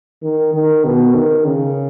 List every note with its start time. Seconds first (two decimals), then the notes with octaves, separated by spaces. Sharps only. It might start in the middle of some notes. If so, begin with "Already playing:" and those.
0.23 D#3
0.54 D#3
0.85 B2
1.15 D#3
1.45 C#3